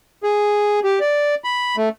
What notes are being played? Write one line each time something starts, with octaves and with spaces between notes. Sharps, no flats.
G#4
G4
D5
B5
A3